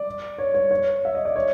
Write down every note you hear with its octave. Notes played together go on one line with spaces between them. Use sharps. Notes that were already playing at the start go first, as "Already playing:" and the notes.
Already playing: D5
C#5
C#5
C#5
E5
D#5
D5
C#5